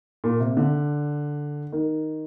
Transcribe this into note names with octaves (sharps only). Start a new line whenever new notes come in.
A#2
C3
D3
D#3